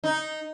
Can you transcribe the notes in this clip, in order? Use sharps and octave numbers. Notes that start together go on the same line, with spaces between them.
D#4